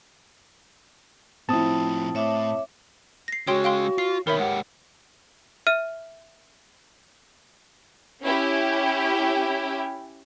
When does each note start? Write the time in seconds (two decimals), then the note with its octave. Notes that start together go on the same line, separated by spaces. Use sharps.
1.49 A2 F3 C4 E4 A5 D#6
2.15 A2 C#5 E5 D6
3.28 A#6 C7
3.47 C#3 G#3 F#4 C#5 G5 C6
3.64 F5 G5 C6
3.98 F4 C7
4.27 B2 D#3 A#4 C#5 E5 B5
4.39 G#2 G4 F#5
5.67 E5 F6 D#7
8.24 C#4 E4 G4